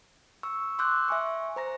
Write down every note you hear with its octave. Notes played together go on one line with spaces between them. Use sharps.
C#6 E6
C6 D6 E6 F#6 G6
E5 G#5 C#6
C5 A#5 A#6